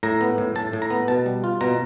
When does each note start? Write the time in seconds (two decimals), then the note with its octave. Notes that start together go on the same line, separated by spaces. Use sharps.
0.03 A2 A#5
0.21 B3
0.38 A2
0.55 A2 A5
0.73 A2
0.82 A#5
0.90 B3
1.08 B2 A5
1.26 G3
1.44 F4
1.61 B2 A#5